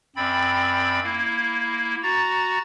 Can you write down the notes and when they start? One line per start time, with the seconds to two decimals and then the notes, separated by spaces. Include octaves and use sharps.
0.16 F#2 C4 D5 G5 B5
1.04 A#3 E4
2.03 F#4 A#5 A6